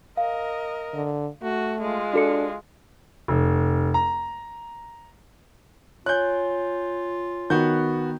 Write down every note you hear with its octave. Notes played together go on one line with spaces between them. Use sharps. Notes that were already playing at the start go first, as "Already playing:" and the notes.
A#4 D#5 F5
D3
A3 F#4
G#3 F4
D4 F#4 A4 C#7
F1
A#5
F4 C#5 G#5 F#6 G6
D#3 B3 F#4 G6